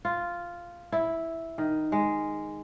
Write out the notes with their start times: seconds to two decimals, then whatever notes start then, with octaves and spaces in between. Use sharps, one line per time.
0.05 F4
0.92 E4
1.58 D#3
1.92 G#3